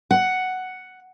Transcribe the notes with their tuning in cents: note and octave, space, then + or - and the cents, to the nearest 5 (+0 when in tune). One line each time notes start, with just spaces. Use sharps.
F#5 +5